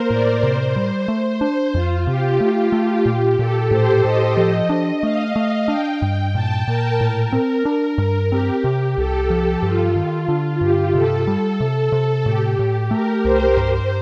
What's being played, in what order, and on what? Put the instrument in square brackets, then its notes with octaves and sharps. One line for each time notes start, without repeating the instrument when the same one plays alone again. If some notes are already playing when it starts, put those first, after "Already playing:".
Already playing: [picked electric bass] A#3 [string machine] A#4 C5
[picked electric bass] A2 [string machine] D5
[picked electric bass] C3 [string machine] C5
[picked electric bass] G3
[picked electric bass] A3 [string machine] C5
[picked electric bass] D4 [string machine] C5
[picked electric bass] F2 [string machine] F4
[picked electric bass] C3 [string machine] G4
[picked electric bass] A3 [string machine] G4
[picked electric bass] A3
[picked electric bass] A#2 [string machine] G4
[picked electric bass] A#2 [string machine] A4
[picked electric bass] A2 [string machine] C5
[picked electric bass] A2 [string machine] D#5
[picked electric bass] F3
D4
[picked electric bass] A3 [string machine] F5
[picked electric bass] A3
[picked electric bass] D4 [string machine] G5
[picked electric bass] G2
[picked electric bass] A#2 [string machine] A5
[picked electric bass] A#2 [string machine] A#4
[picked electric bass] A2
C4
D4
G2
[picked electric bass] C4 [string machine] G4
[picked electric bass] C3
[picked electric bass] C2 [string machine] A4
[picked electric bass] F3 [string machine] G4
[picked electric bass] G2 [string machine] F4
[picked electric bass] D#3
D3
[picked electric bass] G2 [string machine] G4
[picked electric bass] C3 [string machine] A4
[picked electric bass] G3
[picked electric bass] C3 [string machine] A4
[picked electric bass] C3
[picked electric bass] A2 [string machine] G4
[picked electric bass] A2
[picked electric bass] A3 [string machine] A#4
[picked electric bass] C2 [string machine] C5
[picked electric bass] G2 [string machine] C5